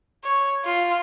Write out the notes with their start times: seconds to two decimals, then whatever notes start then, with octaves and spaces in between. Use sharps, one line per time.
0.24 C#5
0.65 F4